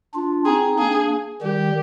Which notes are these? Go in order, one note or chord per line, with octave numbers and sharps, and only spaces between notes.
D4 F4
C4 D#4 G#4
A#3 D4 G#4
D#3 G3 G4